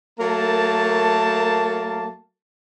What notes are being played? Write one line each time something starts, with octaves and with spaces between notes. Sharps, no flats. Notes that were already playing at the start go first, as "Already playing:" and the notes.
F#3 A3 A#3 A#4 A5